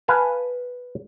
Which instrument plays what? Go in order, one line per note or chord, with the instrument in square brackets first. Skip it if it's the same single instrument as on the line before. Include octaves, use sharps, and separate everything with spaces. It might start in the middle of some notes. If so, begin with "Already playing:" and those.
[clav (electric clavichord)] B4 F5 G#5 A5